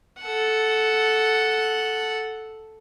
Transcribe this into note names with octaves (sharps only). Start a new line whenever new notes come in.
A4 F#5